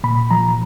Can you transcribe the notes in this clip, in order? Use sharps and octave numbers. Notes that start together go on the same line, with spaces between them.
A#2 B5
F3 A#5